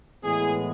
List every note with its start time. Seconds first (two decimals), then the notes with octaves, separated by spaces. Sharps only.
0.23 A2 E3 G#3 B3 G#4